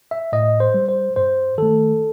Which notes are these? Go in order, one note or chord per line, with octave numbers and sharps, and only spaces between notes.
E5
A2 D#5
C5
G3
C5
G2 C5
D#3 A3 A4